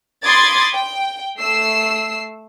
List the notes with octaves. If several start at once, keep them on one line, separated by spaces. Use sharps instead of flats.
B5 C6 D6 D#6 G#6 A6
G5
A3 E6 C7